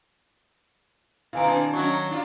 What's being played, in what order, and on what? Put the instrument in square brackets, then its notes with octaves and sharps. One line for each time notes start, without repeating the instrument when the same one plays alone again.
[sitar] B2 D#3 [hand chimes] E4 D7 [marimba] F5 G#5 A#5
[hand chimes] C4 D4 A5
[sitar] D#3 C#4 D#4 [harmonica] F#3 [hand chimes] C#6
[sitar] D4 F4 [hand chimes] D#4 A#5